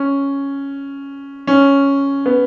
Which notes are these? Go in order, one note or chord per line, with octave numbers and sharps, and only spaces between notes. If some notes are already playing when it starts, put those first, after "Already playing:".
Already playing: C#4
C#4
B3